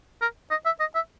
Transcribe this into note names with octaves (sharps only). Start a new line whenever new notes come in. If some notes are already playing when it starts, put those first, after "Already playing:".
A#4
D#5
E5
D#5
E5